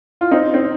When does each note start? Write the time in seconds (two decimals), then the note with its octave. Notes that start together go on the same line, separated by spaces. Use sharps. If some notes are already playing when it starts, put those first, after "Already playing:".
0.21 F4
0.31 C4 D#4
0.54 C4